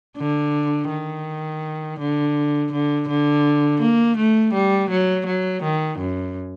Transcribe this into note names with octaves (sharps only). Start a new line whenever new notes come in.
D3
D#3
D3
D3
D3
A#3
A3
G3
F#3
F#3
D#3
F#2